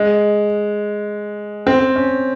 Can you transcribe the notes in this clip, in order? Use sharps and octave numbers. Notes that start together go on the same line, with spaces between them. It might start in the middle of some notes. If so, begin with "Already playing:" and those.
Already playing: G#3
C4
C#4